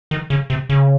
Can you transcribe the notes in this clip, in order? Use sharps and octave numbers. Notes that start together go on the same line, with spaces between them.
D#3
C#3
C3
C#3